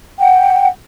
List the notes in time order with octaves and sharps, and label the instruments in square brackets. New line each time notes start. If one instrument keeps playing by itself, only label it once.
[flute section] F#5 G5